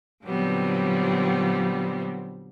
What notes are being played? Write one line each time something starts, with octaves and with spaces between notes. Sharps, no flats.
A#2 D3 F#3 G3 B3 C4